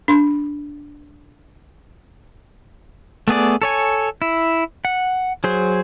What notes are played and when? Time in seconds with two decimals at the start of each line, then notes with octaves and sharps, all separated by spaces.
0.08 D4 C6
3.28 A3 B3 G#4 D5
3.62 A4 C#5 G#5
4.22 E4
4.85 F#5
5.44 F#3 G#4 C5